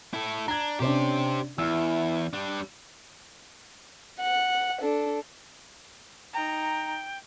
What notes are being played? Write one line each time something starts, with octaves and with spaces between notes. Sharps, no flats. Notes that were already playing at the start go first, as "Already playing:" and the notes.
E4 A4
D4 A#5 G#6
C3 C#4 D4 G4 C5
E2 E4 E6 F6
G3 D4
F#5
D4 A4
D#4 G5 A#5